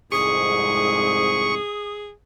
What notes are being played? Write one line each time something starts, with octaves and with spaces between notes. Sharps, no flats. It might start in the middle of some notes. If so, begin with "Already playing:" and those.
C2 F2 G#2 G#4 C#6 D#6